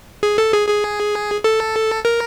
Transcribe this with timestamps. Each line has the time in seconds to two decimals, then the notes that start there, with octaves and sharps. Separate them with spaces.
0.23 G#4
0.38 A4
0.53 G#4
0.68 G#4
1.44 A4
2.05 A#4